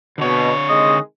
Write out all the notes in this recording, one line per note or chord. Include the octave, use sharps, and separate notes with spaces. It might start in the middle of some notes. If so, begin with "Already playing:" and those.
B2 D3 C#5
C3 D#3 G#3 D#5